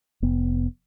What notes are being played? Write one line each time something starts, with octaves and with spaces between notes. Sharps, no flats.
F1 B3